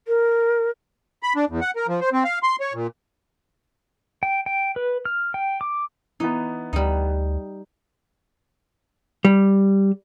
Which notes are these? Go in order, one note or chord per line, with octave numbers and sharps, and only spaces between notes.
A#4
B5
D4
E2
F#5
A#4
F3
C5
C4
F5
C6
C#5
A#2
G5
G5
B4
F6
G5
D6
E3 B3 D#4
D2 G3 D#4
G3